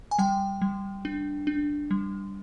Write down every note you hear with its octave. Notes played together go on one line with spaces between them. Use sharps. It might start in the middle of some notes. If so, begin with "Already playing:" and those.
G#5
G3 G5
G3
D4
D4
G3